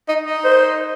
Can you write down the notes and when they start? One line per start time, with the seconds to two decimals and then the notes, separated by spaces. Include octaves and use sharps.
0.08 D#4
0.27 D#4
0.44 C5